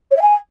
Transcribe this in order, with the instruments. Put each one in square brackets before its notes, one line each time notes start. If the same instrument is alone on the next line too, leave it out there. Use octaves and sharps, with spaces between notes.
[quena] C#5
E5
G#5